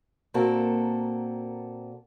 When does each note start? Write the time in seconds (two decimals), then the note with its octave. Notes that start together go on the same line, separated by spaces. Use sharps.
0.34 A#2 A#3 C4 F#4 A4 A5